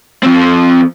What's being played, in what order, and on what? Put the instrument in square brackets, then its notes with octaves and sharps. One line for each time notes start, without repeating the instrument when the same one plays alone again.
[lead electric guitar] F3 C4